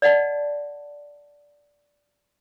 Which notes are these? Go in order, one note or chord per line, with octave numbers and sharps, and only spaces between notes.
D5 D#5 F#5 A5